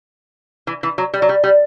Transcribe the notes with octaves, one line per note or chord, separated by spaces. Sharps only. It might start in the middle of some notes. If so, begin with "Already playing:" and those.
E3
E3
F#3
G3
F#3
G3
G3